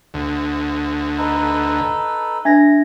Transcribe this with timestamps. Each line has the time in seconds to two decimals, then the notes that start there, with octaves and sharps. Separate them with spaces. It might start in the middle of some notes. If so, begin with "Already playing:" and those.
0.14 D2
1.18 D#4 A4 B4
2.45 D4 E5 G#6 A#6